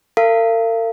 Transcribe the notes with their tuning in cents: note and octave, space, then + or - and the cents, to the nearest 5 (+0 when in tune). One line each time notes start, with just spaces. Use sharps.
A#4 -45 F5 -35